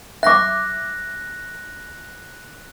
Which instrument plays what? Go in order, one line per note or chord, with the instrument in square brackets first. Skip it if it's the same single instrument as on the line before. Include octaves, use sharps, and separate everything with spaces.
[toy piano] E5 D6 [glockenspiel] F#6 A#6